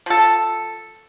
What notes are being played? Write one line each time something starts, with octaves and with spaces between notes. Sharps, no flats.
F3 A4